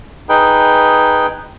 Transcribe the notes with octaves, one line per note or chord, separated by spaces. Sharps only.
D#4 G#4 B4 G5